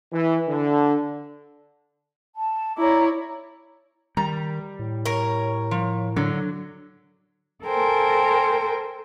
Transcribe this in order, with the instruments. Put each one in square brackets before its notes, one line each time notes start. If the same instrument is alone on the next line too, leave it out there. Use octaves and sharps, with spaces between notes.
[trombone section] E3
D3
[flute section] A5
[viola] E4 C#5 [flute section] D5 A#5 D6
[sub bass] D#3 [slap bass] G3 [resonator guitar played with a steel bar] A#5
[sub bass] A2
[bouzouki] A#4 C#5
[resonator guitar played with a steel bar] F3
[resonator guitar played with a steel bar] D3 [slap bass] F#3
[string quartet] A4 A#4 C5 G5 G#5